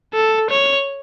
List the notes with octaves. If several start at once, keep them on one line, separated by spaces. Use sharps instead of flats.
A4
C#5